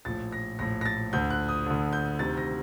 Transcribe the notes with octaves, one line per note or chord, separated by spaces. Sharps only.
A#1 A2 A6
A#6
A#1 A2 A#6
A#6
A6
D2 D3 G6
F#6
D#6
D2 D3
G6
D2 C3 D#3 A6
A#6